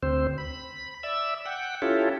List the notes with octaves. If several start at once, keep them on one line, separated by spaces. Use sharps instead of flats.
D2 C4 C5
B5
D5 E5 E6
F#5 G5
C#4 E4 F4 G4 A4